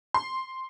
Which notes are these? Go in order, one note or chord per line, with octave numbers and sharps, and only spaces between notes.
C6